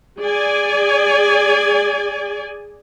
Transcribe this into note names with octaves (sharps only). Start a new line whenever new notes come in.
G#4 D5 G#5